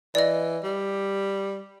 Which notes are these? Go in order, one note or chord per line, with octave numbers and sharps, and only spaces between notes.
E3 D5 D#5
G3